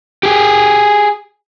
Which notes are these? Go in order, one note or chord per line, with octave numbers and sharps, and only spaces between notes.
G4 G#4